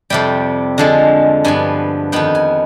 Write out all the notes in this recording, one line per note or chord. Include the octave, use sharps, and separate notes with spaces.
F2 C3 G3 G5
D3 F3 G#3
G2 F3 B3 G#5
F2 D#3 B3 G5
G#5